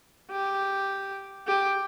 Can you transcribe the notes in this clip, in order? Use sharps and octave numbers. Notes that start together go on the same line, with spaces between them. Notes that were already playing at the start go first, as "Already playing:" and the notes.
G4
G4